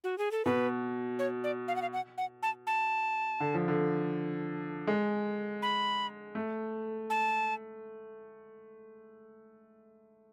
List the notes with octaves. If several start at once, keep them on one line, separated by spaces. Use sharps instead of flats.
F#4
G#4
A4
B2 B4
C#5
D5
F5
F#5
F5
F#5
F#5
A5
A5
D3
F3
D3
G#3
B5
A3
A5